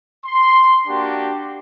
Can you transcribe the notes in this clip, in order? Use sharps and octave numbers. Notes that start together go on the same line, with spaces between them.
C6
A#3 D4 F#4 G4